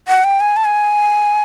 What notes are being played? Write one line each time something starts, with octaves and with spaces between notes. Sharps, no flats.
F#5
G5
G#5
A5
G#5